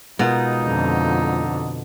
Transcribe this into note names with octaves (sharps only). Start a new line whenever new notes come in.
B2 G#3 D#4 F4 A#4
F2 D3